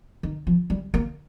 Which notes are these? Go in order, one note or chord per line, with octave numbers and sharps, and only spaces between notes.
D#3
F3
G3
A#3